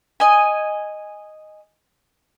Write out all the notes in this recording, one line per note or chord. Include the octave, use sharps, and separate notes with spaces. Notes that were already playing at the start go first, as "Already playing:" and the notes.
D#5 G#5